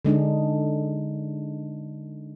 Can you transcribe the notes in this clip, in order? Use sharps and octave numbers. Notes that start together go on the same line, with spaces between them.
D3 G#3 D4 D#4